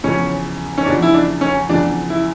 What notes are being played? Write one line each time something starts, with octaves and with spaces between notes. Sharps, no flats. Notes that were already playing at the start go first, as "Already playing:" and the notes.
E2 C#3 F3 C#4
C#4
E2 C#3 F3 D4
E4
D4
C#4
E2 C#3 F3 D4
E4